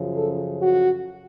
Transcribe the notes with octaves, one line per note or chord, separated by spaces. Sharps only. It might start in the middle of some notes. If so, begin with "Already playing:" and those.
Already playing: F#2 C#3 F3
A4
F#4